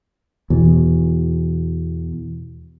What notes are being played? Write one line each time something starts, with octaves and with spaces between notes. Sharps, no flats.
E2 B2